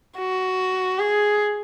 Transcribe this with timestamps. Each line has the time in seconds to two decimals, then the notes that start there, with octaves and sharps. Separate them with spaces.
0.18 F#4
0.99 G#4